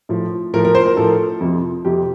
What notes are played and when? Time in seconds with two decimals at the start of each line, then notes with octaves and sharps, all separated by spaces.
0.09 A2 F3
0.54 A2 F3 A#4
0.65 A#4
0.75 C5
0.86 A#4
0.97 A2 F3 A4
1.40 F2 C3 F3
1.85 F2 C3 F3 G4